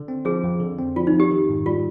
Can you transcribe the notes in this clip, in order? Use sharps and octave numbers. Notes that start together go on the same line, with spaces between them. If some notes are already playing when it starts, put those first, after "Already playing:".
Already playing: D3
C4
F3 G#4
F2
D3
C4
F3 F4
D#4
F2
G4
D#3
G#2
G3 F4